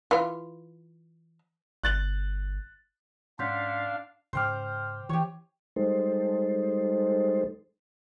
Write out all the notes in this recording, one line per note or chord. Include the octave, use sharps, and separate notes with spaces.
E3 F4
G1 F#6 A6 F#7
G#2 C#4 D4 F5 F#5 C6 G6 B6
G#2 C#3 C5 G5 D6 F6
E3 G4 C#5
G3 G#3 D#4 A4 C5